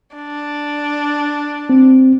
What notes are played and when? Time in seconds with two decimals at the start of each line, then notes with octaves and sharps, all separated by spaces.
0.16 D4
1.70 C4